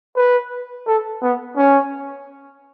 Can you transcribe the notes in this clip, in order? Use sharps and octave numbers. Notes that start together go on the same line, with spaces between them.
B4
A4
B3
C#4